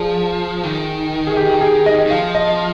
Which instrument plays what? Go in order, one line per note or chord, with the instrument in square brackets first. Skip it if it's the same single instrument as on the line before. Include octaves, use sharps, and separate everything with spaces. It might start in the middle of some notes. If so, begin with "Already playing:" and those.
Already playing: [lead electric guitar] F3 [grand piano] G#4 D5
[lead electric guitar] D#3
[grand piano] G#4
G4
G#4
D#5
[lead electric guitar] D#3
[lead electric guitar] F3 [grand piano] F5
[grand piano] D#5